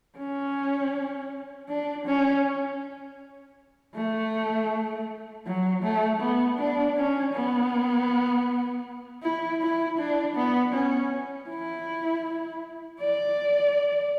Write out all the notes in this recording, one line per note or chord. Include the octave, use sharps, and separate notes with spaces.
C#4
D4
C#4
A3
F#3
A3
B3
D4
C#4
B3
E4
E4
D4
B3
C#4
E4
D5